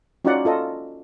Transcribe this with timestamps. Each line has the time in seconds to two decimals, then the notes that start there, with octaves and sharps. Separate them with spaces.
0.25 C#4 D#4 F4 F#4 D5 F#5
0.45 F4 A4 D#5